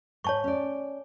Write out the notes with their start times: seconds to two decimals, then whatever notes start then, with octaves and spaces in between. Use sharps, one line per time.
0.24 G#2 C#5 A5 C#6
0.44 C#4 D5